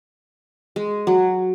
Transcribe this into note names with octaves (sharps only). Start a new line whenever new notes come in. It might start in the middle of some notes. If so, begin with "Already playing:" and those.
G#3
F#3